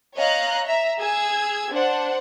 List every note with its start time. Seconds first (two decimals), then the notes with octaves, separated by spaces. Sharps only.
0.14 C#5 D#5 F5 A#5 F#6
0.66 E5 A#5
0.99 G#4 E6 G#6
1.72 D4 C5 F#5